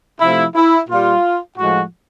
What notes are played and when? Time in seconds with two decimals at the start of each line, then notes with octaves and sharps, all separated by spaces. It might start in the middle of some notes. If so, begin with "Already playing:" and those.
0.20 C3 F3 A3 E4
0.55 E4
0.89 A#2 G3 F4
1.58 A2 F3 G#3 F#4